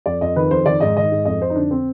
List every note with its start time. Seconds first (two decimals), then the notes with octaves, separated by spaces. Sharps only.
0.06 F2 D5
0.21 F2 D#5
0.36 D#3 B4
0.51 F2 C5
0.65 D#3 D5
0.80 G#2 D#5
0.97 D#3 D#5
1.12 G#2
1.25 F2 D#5
1.41 F2 C5
1.50 D#4
1.56 D3 D4
1.70 D3 C4